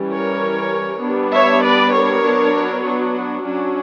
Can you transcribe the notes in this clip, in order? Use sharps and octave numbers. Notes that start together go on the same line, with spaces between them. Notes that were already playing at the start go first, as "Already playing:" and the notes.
Already playing: E3 G3 C#4
A#4 C#5
G3 B3 D4
C#5 E5
B4 D5
A#4 C#5
F#3 B3 D4
D4 F#4
F#3 C#4 D4 F#4